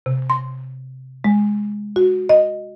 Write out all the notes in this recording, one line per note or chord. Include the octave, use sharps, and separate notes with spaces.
C3
C6
G#3
F#4
D#5